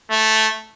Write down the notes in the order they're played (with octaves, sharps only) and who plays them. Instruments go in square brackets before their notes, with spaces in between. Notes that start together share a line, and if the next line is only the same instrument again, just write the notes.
[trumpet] A3